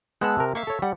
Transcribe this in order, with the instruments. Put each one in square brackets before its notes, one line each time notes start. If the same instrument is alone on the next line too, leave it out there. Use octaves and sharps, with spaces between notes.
[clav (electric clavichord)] G#3 B3 F#5 [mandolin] A5 E6 F#6
[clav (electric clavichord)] C3 A#4
[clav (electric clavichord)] A#3 [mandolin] E5 F5 C#6
[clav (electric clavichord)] A4 C#5
[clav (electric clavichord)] G3 [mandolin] F#5